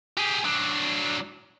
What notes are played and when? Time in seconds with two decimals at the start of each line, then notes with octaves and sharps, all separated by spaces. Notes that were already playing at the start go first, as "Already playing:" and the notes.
0.17 G4 G#4
0.44 F#3 D4